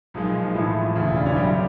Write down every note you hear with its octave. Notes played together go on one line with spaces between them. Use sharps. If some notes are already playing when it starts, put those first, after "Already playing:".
B1 A#2 F3 G#3 D#4
A1 A2 F3 A3
E1 D2 C#3 F4
E4
D4
C#4
F#2 D3 G3 G4